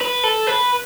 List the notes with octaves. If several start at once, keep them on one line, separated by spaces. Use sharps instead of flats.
B4
A4
B4